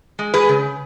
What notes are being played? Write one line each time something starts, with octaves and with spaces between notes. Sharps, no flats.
G#3
G#4 B4
C#3